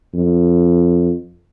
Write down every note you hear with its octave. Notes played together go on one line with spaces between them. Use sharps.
F2